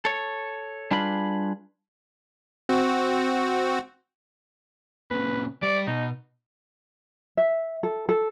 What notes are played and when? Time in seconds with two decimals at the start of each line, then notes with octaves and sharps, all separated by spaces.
0.05 A4 C#5
0.91 G3 D4 F4 G#4 B4 B5
2.69 C4 F#4
5.11 A#2 C#3 B4
5.63 G3 D5
5.87 B2 D#4
7.37 E5
7.83 A4
8.09 A4